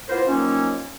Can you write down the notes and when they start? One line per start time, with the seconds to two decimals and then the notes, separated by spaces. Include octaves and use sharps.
0.09 A#3 B3 E4 F4 A#4 C5
0.27 D#3 F3 F#3 A#3 C#4